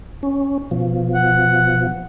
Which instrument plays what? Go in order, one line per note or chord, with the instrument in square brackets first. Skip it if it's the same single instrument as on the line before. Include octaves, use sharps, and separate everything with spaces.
[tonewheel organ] C#4
B2 F3
[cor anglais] F#5